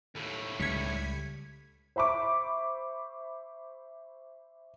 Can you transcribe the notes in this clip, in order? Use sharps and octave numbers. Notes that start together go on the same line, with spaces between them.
D#2 A2
C#2 G3 G#6 B6 C#7
C5 E5 B5 C#6 D6